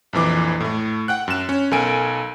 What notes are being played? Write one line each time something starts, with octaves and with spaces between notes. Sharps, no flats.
A#1 F2 E3 D6
A2 A3
F#5 G5 F#6
F#2 E7
C#4
B1 A4 A#4 G#5 D7